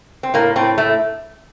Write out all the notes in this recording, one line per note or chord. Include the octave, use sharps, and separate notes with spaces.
C4
A2 A#3
A2 C4
A2 A3